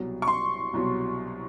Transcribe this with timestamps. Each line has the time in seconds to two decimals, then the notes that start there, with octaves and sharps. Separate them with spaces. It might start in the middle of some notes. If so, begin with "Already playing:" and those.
Already playing: C2 B2 F#3
0.22 C#6
0.28 C6
0.73 C2 B2 F#3